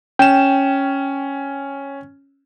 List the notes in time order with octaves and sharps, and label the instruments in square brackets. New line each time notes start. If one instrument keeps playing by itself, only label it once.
[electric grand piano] C#4 E7 [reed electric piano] G5